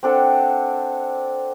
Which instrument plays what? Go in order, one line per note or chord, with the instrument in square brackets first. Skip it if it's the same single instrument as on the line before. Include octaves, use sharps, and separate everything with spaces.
[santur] C4 D4 A4 F#5